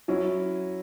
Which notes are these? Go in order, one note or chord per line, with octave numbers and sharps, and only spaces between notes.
F#3 C#4 E4